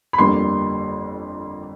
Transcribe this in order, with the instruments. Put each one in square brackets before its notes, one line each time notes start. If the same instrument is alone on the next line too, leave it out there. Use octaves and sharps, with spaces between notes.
[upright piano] B5
G1 F2 D3 G3 A#3 C6